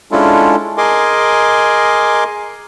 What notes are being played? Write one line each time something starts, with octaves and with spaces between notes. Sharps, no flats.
G#3 C#4 D4 E4 F4 A4
G#4 A#4 D#5 G#5 C6 D6